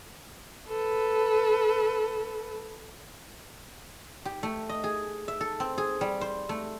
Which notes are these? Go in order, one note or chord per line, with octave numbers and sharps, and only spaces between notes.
A4 B4
G4
A3
D#5
G#4
E5
A4
C4
G#4
G3
C5
A3